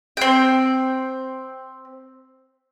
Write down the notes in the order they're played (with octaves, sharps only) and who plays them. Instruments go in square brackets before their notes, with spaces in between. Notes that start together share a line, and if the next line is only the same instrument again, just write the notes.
[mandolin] C4 G5